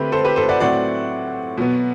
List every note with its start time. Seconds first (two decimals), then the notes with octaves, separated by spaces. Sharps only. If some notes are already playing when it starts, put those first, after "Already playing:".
Already playing: D3 A3 C4 G4 B4
0.12 A4 C5
0.25 G4 B4
0.36 A4 C5
0.49 D5 F#5
0.60 A2 F#3 C4 D5 F#5
1.58 B2 F#3 B3